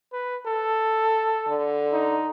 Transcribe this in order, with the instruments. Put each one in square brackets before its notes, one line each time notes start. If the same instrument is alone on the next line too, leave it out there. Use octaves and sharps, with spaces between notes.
[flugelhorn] B4
A4
[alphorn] D3
[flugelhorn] D#4